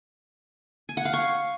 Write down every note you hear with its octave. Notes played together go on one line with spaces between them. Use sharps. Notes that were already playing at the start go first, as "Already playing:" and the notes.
G#5
F#5
F5
C#6